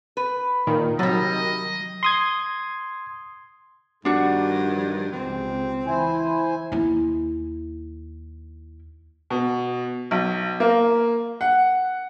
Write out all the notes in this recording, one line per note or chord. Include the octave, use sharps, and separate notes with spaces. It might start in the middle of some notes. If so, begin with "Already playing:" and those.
B4
A#2 D#3
C3 F#3 G3 D#5
C6 D#6 G#6
G2 D#3 F3 D4 F#4
C#2 C3 C4
E3 E4 C5 G#5
D#2 E4
B2
B1
A#3
F#5